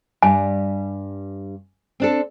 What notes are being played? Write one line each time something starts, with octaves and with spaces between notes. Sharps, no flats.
G2 G3 G#5
C4 D4 A4